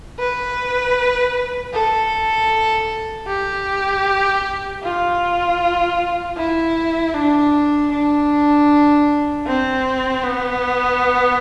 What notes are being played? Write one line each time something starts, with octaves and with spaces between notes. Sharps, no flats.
B4
A4
G4
F4
E4
D4
D4
C4
B3